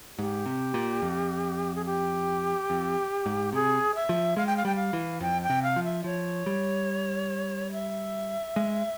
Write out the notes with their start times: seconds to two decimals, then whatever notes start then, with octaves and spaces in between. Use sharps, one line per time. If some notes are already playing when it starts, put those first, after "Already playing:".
0.18 G#2 G4
0.46 C3
0.74 A#2
1.02 F2
1.75 G#4
1.86 G4
2.70 F2
3.26 G#2
3.53 C3 G#4
3.95 E5
4.09 F3
4.37 G#3 F5
4.47 G5
4.57 F5
4.65 G3 G5
4.76 F5
4.93 E3
5.20 F2 G5
5.42 G5
5.50 C3
5.63 F5
5.76 F3
5.84 E5
6.04 F3 C#5
6.46 G3
7.72 E5
8.56 G#3